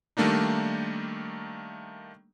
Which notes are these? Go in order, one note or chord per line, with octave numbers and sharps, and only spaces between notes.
D#3 G3 A3 A#3 D4 D#4